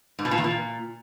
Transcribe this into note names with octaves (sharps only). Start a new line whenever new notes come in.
G#2
B2
A#2
E2
A#2